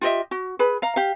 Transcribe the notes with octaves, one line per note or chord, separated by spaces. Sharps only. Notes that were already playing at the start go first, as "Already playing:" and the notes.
F4 G4 D#5 E5
F#4
G#4 B4 B5
F5 A#5
G4 F5